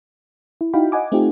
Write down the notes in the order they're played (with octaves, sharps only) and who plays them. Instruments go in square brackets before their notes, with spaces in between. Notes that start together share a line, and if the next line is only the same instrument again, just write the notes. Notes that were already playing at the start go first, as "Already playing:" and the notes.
[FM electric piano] E4
D#4 E4 F#4 F5 G5 B5
D#5 F#5 G#5 D6
A3 C4 D#4 F4 G4